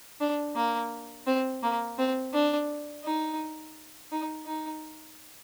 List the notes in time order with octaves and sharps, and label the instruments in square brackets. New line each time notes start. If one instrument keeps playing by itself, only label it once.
[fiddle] D4
A#3
C4
A#3
C4
D4
D#4
D#4
D#4